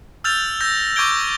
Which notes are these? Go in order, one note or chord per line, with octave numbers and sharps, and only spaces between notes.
E6 F6 G6 A6 F7
E6 G6 A#6
C#6 D6 G6 G#6 D7 G7